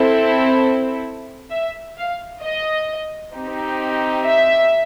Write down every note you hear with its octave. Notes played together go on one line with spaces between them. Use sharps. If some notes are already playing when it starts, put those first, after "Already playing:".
Already playing: C4 E4 A4
E5
F5
D#5
C4 D#4 G4
E5